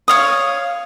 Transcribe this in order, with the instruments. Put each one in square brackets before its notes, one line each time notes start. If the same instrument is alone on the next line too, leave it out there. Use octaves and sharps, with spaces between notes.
[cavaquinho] C#5 F5 D#6